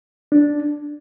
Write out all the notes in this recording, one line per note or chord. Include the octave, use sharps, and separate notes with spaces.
D4